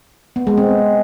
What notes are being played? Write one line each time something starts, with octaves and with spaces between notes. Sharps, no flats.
B3
G#3
C4